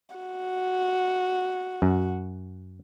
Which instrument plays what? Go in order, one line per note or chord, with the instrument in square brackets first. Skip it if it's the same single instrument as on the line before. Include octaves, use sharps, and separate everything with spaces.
[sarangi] F#4
[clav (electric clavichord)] F#2